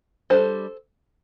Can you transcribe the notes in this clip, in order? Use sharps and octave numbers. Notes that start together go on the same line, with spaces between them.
G3 D4 A4 C5